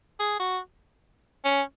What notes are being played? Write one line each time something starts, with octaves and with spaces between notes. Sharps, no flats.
G#4
F#4
C#4